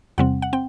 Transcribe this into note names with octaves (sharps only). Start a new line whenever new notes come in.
E2 C3 G3 C4 F#5
F#5
C4 G5